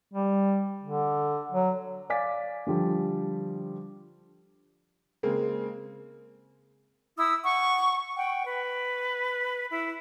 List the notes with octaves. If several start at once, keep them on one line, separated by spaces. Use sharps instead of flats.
G3
D3
F#3
D5 F5 G#5 D6 A6 B6
D3 F3 G3
C#3 G#3 A#3 C4
E4 D#6 E6
F#5 C#6
F#5 G5
B4
E4